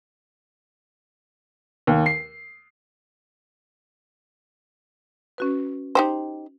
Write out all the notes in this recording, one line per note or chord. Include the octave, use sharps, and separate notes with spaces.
D#2
C7
C#4 F#4 B4
D#4 G4 C5